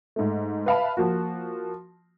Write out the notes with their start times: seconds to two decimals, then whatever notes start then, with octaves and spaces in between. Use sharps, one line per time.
0.16 G#2 A3
0.66 B4 E5 F5 A5 B5
0.97 F3 A#3 F#4